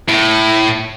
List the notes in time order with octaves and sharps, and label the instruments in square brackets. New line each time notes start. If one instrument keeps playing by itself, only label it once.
[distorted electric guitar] A2